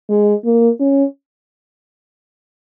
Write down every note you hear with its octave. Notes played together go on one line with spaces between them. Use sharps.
G#3
A#3
C#4